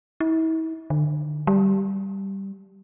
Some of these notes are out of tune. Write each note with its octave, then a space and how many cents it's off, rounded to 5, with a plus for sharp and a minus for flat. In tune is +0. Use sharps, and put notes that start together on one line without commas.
E4 -40
D3 +35
G3 -5